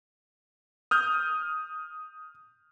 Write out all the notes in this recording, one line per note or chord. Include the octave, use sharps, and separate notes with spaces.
D#6 F6 G6